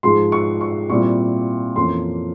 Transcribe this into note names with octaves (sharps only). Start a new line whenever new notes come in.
G#2 F3 G#3 C6
C#6
C#6
A#2 G3 C4 E4 C#6
F2 E3 A#3 C#4 C6